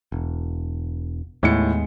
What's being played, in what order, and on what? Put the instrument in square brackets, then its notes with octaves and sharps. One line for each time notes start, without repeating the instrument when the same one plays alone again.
[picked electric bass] E1
[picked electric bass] D#2 G#3 B3 [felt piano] A2 C#7